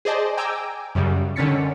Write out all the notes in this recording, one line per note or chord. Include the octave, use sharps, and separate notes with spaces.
G#4 C5 D5 D#5 A5
G5 G#5 A#5 D6 E6 D7
F#2 C#3 G3
D3 D#3 C#4 A6 B6 C#7